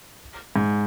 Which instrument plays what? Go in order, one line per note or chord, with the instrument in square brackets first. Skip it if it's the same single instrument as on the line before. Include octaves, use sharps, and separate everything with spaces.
[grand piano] G#2